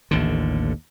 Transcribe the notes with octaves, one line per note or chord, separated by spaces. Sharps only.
A1 D#2 D3